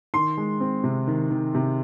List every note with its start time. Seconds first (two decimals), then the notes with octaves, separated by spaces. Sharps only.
0.14 D#3 C6
0.37 G#3
0.60 C4
0.84 C3
1.07 D#3
1.30 D#3
1.55 C3